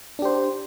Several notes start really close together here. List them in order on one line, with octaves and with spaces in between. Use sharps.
D4 G4 C5